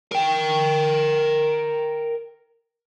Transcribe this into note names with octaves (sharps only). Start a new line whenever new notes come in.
A#4 G5